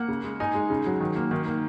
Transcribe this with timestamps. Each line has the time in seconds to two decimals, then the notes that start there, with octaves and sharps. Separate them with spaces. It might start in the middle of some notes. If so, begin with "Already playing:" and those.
Already playing: A#3 F#5
0.08 C#3
0.24 G#3
0.40 D#4 G#5
0.55 G#3
0.70 C#3
0.86 F#3
1.00 D#3
1.16 A#3
1.31 D#3
1.46 A#3